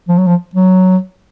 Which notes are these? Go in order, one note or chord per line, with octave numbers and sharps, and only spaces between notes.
F3
F#3
F3
F#3